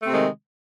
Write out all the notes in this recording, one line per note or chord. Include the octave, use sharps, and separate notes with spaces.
C3 D#3 G#3 A3 C4